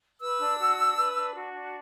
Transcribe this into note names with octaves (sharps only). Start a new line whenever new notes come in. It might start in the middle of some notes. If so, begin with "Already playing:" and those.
B4 E6
D4
F#4
D4
B4
D4
F#4
D4